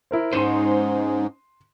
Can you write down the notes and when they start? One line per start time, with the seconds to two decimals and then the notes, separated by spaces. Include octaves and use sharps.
0.11 E4 A#4 C5
0.33 G#2 C#4 D#4 C5 C6 D#7 E7